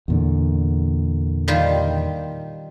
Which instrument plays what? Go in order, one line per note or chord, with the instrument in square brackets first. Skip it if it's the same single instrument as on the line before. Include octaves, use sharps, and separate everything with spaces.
[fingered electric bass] E2 A#2 D3
[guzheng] D#3 G3 F4